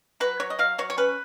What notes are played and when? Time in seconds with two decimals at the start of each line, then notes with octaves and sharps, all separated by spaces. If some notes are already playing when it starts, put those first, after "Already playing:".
0.20 F#3 B4
0.40 F#3 C#5
0.50 D#5
0.59 F#3 F5
0.78 F#3 C#5
0.90 C#5
0.98 C#4 B4